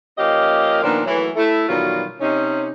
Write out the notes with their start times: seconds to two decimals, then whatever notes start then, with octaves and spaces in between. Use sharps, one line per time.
0.18 F3 A#3 C#4 G4 D#5 F5
0.83 A#2 D#3 F3 A#3 B3 D4
1.05 E3 F#3 A3
1.36 A3 E4
1.68 B2 D#3 E3 F#3 G3 F4
2.20 C3 C#4 D#4